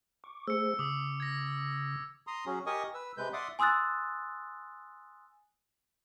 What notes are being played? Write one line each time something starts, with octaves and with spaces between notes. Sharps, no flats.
C#6 D6
A3 G#4 C5 E6 C#7
C#3 D6 D#6
G#6 A#6
A#5 C6 D#6
F#3 C#4 F#4 G#4
G4 A#4 D#5 G#5 C#6 D#6
B4 E6
C3 G#3 B4 G6
D5 E5 F#5 C6 D6 D#6
G#5 C6 D#6 E6 F#6 A6